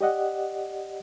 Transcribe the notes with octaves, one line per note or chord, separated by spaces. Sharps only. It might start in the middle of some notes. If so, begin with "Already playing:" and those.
G4 D5 D#5 F#5